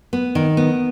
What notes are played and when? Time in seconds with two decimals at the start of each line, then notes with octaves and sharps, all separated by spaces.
0.13 B3
0.35 D#3
0.57 B3